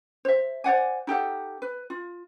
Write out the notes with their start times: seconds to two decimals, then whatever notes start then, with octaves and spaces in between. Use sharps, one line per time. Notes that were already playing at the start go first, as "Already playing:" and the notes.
0.25 C5 E5
0.64 C5 D5 F#5 G#5
1.07 D#4 G4 A4 F#5
1.62 B4
1.90 F4